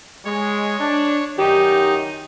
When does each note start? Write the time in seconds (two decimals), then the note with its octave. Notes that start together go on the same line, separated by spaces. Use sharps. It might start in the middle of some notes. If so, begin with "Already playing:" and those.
0.25 G#3 C#5
0.80 D4
1.38 F#2 D#3 D#4 G4